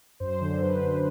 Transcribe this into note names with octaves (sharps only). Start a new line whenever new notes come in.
F#2 C5
D3
F#2 B4
F#2